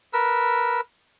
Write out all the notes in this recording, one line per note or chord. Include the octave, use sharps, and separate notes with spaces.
A#4 B4 E6